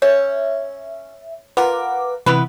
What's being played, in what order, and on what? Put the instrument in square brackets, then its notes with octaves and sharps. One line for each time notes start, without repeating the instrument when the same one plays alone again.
[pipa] C#4 [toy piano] C#5 [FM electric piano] E5
[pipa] F4 A#4 [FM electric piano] B4 F#5 D6
[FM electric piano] C3 E3 [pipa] B3 E4 B4